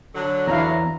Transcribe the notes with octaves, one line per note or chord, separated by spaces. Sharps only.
D3 F#3
E2 D4 E4 F5 A#5